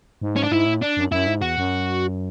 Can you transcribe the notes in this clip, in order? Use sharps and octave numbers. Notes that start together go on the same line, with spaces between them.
G#2
C#4
D4
G#2 E4
A2
D4
F#2
F#2 E4
G#2
E2 F#4
F#2